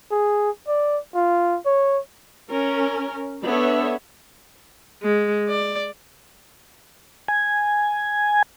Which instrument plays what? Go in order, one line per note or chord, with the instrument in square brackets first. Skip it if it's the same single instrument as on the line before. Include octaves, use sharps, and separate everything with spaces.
[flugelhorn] G#4
D5
F4
C#5
[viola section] C#4 A#4
B3 D4 A4 C#5 E5
[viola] G#3
D5
[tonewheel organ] G#5